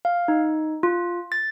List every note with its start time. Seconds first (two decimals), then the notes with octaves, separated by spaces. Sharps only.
0.05 F5
0.28 D#4
0.83 F4
1.32 A6